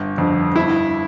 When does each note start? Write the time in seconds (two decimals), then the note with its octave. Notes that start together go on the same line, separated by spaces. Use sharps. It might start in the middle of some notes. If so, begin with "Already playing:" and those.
Already playing: G1
0.18 F2 D3
0.55 G1 E4